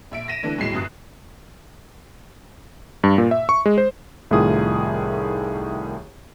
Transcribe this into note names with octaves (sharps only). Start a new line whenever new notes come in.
A#1 E5 D7
A#6 B6 D#7 E7
D3 E3 A3 D4 E4
D#2 A2 F#3 G#3 C7 E7
G1 F#2 D#6 F#6
G2
A#2
E5
C#6
G#3
C5
C2 A2 D#3 F4 G#4 D#6